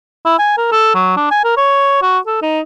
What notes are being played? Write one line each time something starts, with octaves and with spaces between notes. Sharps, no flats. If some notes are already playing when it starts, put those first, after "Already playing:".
E4
G#5
A#4
A4
F#3
D4
G#5
A#4
C#5
F#4
A4
D#4